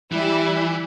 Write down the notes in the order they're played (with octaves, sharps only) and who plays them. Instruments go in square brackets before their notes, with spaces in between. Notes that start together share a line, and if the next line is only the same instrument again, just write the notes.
[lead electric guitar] E3 [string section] G3 E4